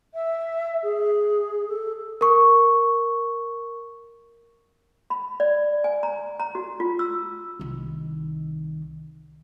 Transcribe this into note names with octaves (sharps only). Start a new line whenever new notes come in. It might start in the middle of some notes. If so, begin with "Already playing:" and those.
E5
G#4
A4
A#4 C#6
B5
D5
G#5
A#5
A#5
F#4
F4
E6
C2 D#3